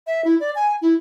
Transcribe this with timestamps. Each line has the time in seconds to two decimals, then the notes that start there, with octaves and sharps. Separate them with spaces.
0.07 E5
0.25 E4
0.40 D5
0.55 G#5
0.82 E4